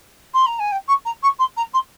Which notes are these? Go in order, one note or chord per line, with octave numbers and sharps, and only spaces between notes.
C6
A#5
G#5
G5
C#6
A#5
C#6
C6
A#5
C6